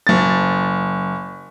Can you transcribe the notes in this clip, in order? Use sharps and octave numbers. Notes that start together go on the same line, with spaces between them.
F#1 A6